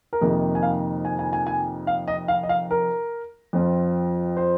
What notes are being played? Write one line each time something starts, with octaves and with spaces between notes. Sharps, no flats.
A#4
F2 C3 D#3 A#3 D#4 G#4
G#5
F5
G#5
G#5
G#5
G#5
F5
D#5
F5
D#5
F5
A#4
F2 F3 C4 F4
C5